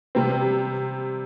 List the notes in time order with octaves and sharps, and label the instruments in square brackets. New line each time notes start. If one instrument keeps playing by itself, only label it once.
[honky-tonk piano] C3 G3 C4